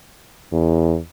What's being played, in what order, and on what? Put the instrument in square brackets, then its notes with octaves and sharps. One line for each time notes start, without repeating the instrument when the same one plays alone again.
[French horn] E2